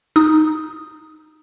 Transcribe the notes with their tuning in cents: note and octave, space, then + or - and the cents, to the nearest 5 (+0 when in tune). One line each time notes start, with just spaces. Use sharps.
D#4 +0 D#6 +0